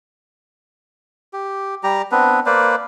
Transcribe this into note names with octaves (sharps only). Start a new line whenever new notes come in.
G4
G3 G4 A#5
B3 C4 D4 B4
A#3 B4 C5 D5